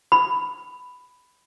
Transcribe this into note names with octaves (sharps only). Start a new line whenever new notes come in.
B5